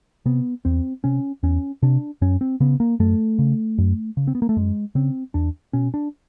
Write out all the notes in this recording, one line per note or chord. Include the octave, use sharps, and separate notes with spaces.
C3 B3
E2 C4
C3 C#4
E2 C#4
C3 D4
F#2 C#4
C4
C#3 B3
A#3
F#2 A3
C#3
F#2
C#3
C4
B3
A#3
A3
F#2 G#3
C#3 C4
E2 D4
B2 C#4
D4